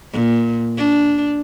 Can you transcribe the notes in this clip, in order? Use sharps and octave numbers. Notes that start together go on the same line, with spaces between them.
A#2
D4